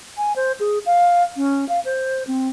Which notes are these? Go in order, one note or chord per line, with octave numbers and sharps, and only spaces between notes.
G#5
C5
G#4
F5
C#4
F5
C5
C4